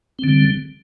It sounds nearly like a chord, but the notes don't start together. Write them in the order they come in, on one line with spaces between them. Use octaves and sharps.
C4 D3 G3